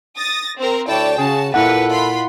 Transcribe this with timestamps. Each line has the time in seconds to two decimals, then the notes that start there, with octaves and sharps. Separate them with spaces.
0.16 D#6 A6 A#6
0.57 C4 A#4
0.88 D2 E4 A4 C#5 D5 G5 A5
1.18 C#3 F#4 G#4 A5
1.54 A#2 E4 G4 A4 B4 F#5
1.88 F4 B5 C6